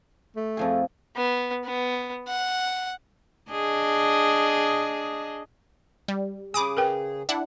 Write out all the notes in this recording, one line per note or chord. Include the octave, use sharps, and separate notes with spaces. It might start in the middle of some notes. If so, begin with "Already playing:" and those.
A3
F2 F3 G#4
B3
B3
F#5
D4 G#4 D#5
G3
C#3 G#4 G#5 B5 D6 D#6
A#4 B4 G5
D4 E4 F#5